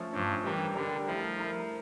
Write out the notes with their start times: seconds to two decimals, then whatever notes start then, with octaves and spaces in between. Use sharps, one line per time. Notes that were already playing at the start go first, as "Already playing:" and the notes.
Already playing: F3 A3 C#4
0.13 G2 F3 A3 C#4
0.44 E3 G3 D4 G4 A#4
0.75 D3 G3 D4 G4 A#4
1.07 F3 A3 E4 A#4
1.38 A3 E4 A#4